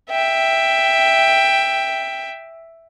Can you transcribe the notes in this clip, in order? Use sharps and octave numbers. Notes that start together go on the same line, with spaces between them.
E5 G5